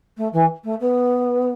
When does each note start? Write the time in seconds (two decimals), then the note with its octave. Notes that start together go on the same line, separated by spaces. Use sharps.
0.17 A3
0.33 E3
0.64 A3
0.80 B3